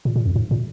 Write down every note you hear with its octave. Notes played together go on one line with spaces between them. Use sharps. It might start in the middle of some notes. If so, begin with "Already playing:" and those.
A#2
A#2
F2
G#2
A#2